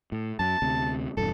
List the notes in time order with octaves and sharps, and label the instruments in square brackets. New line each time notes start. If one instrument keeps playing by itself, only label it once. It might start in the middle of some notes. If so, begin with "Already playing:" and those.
[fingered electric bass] A2
[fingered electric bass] F#2 [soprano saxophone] A5
[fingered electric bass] D2 C3
[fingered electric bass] E1 G2 [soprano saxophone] A4